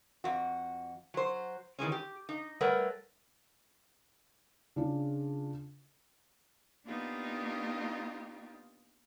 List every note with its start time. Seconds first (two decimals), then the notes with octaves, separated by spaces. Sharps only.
0.24 F2 F#4
1.14 F#3 C5
1.79 D#3 E3 G#3 C#4
1.92 G4
2.29 D#4
2.61 G3 A3 A#4 B4 C#5 F#5
4.76 C#3 D4 F4 G#4
6.86 A#3 B3 D4 D#4 F4 G4